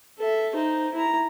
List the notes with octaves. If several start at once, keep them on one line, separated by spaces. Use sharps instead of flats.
A4 E5
D#4 C5
E4 A#5